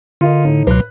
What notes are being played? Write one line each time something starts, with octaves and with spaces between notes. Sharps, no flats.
D3 F4 A#4 D#5
A2 D#4
C#2 B2 F#3 B4 F#6